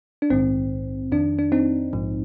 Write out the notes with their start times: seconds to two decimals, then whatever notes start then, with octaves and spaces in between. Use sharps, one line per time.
0.22 D4
0.30 A#1 G#2 D#3 C4
1.12 F2 D#3 D4
1.39 D4
1.52 C4 D#4
1.93 A#1 G#2 F3